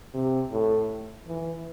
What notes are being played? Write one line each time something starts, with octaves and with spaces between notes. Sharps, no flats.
C3
A2
E3